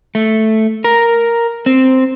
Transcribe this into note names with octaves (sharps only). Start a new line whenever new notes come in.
A3
A#4
C4